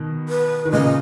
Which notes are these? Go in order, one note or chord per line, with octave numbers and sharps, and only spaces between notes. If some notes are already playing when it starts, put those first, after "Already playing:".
Already playing: B2 D#3
B4
D#3
A#2 C#3 D#5